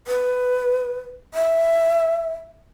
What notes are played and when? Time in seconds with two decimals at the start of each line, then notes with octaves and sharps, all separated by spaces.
0.07 B4
1.34 E5